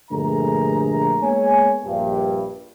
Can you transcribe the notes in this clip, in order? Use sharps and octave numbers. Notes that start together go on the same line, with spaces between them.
A#1 G2 D3 A3 G#4 A#5
G#3 A#3 B3 C#5 G#5
A#1 G2